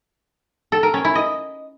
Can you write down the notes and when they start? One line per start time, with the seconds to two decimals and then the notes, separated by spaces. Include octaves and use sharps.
0.72 A4
0.83 A#4
0.94 C#4
1.05 E4
1.15 D#5